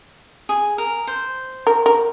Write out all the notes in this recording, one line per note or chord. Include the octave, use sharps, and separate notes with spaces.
G#4
A#4
C5
A#4
A#4